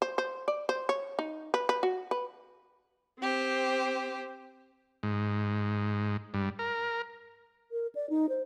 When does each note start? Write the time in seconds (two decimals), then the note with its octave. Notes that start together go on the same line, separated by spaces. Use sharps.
0.02 C5
0.18 C5
0.48 D5
0.69 C5
0.89 C#5
1.19 D#4
1.54 B4
1.69 B4
1.83 F#4
2.11 B4
3.19 C4 G4 C5
5.03 G#2
6.34 G2
6.59 A#4
7.72 A#4
7.95 D5
8.10 D#4
8.29 C5